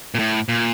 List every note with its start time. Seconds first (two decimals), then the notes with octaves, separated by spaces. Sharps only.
0.15 A#2
0.19 A2
0.49 A#2